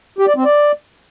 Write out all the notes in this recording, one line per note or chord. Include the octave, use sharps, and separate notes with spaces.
G4
D5
C4
D5